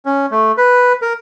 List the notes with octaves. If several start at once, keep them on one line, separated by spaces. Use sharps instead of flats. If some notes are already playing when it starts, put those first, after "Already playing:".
C#4
A3
B4
A#4